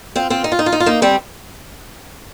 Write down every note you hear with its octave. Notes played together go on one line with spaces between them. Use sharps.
C4 F4
C4 F4
D#4
F4
D#4
F4
D#4
F4
A#3 D#4
G3 C4